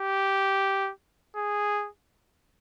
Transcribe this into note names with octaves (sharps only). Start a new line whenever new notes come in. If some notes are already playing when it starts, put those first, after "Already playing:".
Already playing: G4
G#4